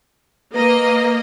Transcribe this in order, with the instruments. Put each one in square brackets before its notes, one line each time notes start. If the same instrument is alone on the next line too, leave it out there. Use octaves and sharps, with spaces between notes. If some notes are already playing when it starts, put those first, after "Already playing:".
[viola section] A#3 D#5 [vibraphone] B4 A#5